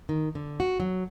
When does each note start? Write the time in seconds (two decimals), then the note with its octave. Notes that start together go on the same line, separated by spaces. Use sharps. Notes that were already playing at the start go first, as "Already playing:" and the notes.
0.09 D#3
0.35 D3
0.60 F#4
0.80 F#3